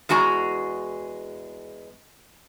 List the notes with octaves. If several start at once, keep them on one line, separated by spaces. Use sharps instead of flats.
E2 G#3 F#4 G#5 A#5